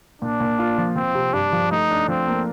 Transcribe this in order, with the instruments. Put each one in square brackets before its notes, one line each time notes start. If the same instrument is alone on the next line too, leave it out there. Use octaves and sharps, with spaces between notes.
[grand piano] A#2 [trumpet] D4
[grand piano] A#2
F4
F3
[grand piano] F3 [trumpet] C4
[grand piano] C3
[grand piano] G2 [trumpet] D4
[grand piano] F3
[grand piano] A3 [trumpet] D#4
[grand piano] D4
[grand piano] F3 [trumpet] C4
[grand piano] A#3